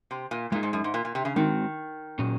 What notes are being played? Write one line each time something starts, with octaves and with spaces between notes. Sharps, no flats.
C3
A#2
A#2 G#3 D#4 G#4
G#2
F#2
G#2
A#2
A#2
C3
C#3
D#3 G#3 C4 F#4
A#2 F#3 C#4 G#4